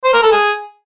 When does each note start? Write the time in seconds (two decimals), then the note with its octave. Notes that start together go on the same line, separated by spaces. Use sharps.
0.04 C5
0.13 A#4
0.23 A4
0.32 G#4